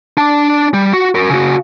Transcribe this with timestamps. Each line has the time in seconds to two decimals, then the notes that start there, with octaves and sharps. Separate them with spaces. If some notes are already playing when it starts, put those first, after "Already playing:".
0.17 D4 A5
0.74 G3
0.93 F#4
1.15 F#4 A#4
1.29 C#3 F#4